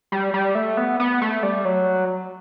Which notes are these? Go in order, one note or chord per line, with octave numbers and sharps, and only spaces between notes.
G3
G3
A3
B3
B3
A3
G3
F#3